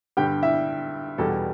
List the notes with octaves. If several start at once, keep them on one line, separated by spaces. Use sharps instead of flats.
G2 D3 G3 G4 G5
E4 E5
E2 B2 G3 A4